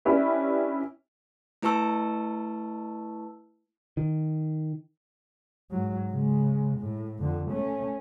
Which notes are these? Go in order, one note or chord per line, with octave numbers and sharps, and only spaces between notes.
C#4 D4 E4 G4 B4 E5
A3 E4 B4 A5 C#6 E6
D#3
G#2 F#3
C#3 G#3
A2
F2 D3
A3 C#4